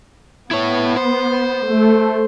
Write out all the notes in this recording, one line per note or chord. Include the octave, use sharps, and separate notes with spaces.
B3 E4 C#5
C5
A3